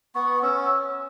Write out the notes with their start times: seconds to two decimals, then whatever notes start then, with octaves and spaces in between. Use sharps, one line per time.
0.15 B3 C#6
0.42 C#4 E6